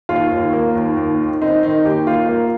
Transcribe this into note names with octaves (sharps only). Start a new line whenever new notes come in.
D#2 F4
D#2
A#3
D#2
D#2
D#3
C4 D#4
D#3 D#4
D#2 G4
A#3 F4
A#3